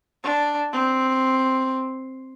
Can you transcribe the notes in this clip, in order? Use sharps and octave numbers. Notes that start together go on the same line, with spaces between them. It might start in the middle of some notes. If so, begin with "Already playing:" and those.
D4
C4